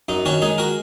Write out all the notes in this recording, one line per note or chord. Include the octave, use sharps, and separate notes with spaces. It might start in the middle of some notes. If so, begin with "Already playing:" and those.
F#2 D#4
D#3 C#4 F#4
G#3 D#4 G#4
F#4 A#4